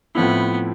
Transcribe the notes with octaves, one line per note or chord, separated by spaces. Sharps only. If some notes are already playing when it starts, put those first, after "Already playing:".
A2 F3 B3 C4 E4